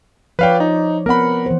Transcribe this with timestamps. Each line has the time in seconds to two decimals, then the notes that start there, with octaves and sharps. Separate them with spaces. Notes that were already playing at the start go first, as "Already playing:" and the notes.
0.39 F3 B4 C#5 D5 F5 G5
0.60 D#4
1.06 B3 C4 A#4 F#5 B5
1.46 E3 C5